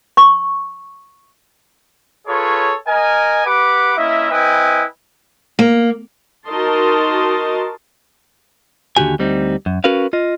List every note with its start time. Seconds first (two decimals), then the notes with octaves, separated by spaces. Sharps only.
0.17 C#6
2.27 F4 G#4 A4 B4 C#5
2.87 A#4 D#5 G#5
3.45 G4 B4 F#5 B5 D6
3.97 A#3 C#4 E4 D#5 E5
4.31 C4 E4 B4 D#5 G5 G#5
5.59 A#3
6.48 D#4 F#4 A#4 D#5 A5 C6
8.97 D#2 D3 F3 F#4 G4 G#5
9.19 D2 G3 C4 D#4
9.66 F#2
9.84 C#4 F#4 A#4 B4 F5
10.13 F4 D#5